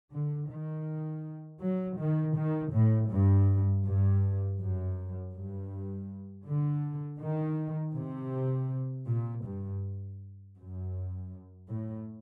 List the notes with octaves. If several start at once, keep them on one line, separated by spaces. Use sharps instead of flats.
D3
D#3
F#3
D#3
D#3
A2
G2
G2
F#2
G2
D3
D#3
C3
A#2
G2
F#2
A2